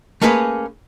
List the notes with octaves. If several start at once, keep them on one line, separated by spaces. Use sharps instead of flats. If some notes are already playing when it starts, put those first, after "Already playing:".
A3 A#3 C#4 G#4 B4 C#5